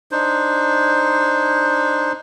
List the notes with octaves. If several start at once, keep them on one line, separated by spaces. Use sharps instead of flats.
D4 D#4 C5